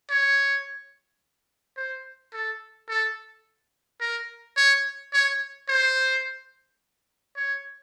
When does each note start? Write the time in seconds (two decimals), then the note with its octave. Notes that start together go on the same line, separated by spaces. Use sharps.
0.10 C#5
1.77 C5
2.33 A4
2.89 A4
4.01 A#4
4.57 C#5
5.13 C#5
5.69 C5
7.36 C#5